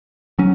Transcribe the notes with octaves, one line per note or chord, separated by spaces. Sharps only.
F#3 C#4